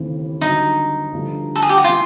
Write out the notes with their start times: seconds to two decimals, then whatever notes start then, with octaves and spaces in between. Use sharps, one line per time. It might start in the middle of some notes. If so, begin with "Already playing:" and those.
Already playing: D#2 C#3 E3 A3 C4
0.41 G2 D3 F#3 D#4
1.12 G2 D3 F3 A3
1.55 A4
1.62 G#4
1.69 G4
1.78 F#4
1.84 C#3 E3 F4